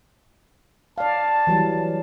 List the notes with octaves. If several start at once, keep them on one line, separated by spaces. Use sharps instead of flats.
D5 F5 A5
E3 F#3 G3